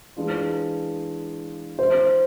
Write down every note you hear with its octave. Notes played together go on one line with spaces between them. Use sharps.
E3 G#3 D4 F4
C5